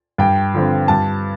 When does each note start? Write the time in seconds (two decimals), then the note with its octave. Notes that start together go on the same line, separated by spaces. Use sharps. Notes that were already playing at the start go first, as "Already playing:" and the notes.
0.18 G2 G5
0.54 D3 F3 C4
0.88 G2 A5